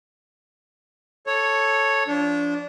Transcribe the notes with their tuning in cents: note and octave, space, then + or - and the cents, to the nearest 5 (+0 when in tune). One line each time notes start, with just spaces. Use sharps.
A4 +0 C#5 +0
F3 -10 D4 -20